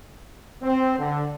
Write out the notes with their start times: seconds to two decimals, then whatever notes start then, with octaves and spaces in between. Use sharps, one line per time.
0.63 C4
0.99 D3